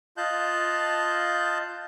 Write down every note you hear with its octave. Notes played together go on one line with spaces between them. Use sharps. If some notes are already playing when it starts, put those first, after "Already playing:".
F4 D#5 F5 A5 F#6 G6